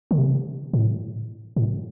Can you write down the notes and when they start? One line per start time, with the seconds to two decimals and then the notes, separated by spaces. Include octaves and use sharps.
0.11 D3
0.18 C3
0.73 A2
1.56 A2